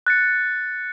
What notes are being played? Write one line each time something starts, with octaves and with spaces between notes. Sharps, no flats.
F#6 A6 C#7